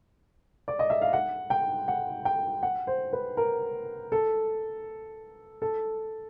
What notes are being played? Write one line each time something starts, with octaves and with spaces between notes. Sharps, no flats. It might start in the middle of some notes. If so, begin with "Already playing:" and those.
D5
D#5
E5
F5
F#5
G5
F#5
G5
F#5
C5
B4
A#4
A4
A4